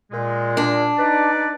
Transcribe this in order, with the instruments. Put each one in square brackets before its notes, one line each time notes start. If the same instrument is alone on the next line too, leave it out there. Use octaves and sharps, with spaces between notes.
[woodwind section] A#2 G#3
[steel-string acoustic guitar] D4
[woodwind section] D#4 B4 D5